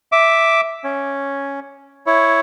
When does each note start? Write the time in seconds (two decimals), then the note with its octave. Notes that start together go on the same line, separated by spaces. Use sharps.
0.12 E5 D6
0.84 C#4
2.07 E4 C#5